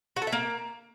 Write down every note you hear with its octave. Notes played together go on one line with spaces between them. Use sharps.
F#4
A4
E5
A#3